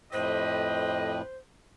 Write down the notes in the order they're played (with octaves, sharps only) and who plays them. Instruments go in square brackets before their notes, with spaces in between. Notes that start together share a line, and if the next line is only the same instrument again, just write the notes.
[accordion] F2 A2 [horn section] G4 B4 D#5 [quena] C5